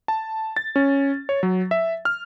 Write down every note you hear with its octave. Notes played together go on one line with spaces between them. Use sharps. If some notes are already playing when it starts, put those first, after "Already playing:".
A5
A6
C#4
C#5
F#3
E5
F6